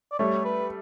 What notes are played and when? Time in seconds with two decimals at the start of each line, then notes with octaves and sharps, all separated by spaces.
0.12 D5
0.19 G3 A3 C#5
0.45 B4